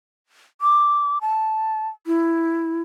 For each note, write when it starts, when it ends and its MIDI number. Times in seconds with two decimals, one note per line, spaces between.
0.61 1.19 86
1.21 1.88 81
2.07 2.82 64